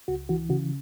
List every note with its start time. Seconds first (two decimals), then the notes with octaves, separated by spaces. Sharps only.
0.08 C#2 F#4
0.29 E3 F#4
0.49 C#3 F#4